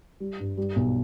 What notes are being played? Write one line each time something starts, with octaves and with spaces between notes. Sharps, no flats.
G3
G2
G3
B1